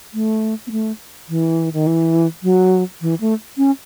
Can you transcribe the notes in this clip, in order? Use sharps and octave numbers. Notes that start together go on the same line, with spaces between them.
A3
B3
A3
E3
D#3
E3
F#3
E3
A3
C#4